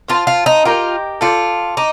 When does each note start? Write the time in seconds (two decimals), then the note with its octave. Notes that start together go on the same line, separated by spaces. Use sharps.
0.08 F4 C5 F5 A5 C6
0.27 F4
0.46 D#4
0.65 F4 G4 A#4 D#5 G5
1.21 F4 A4 D5 G5
1.77 D#4 D6